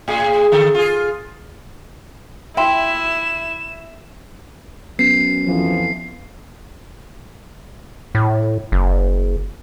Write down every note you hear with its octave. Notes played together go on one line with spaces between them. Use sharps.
A2 G#4
D3 A4
F4 G#4
E4 E5 G5 B5 C6 E7
F#2 B3 C7
F2 E3 F3
A2
F#1